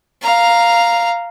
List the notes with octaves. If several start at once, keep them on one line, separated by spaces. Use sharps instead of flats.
F5 A#5